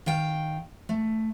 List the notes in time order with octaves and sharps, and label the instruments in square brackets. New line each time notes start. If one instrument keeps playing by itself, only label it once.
[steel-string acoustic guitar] D#3 F5 G5
A3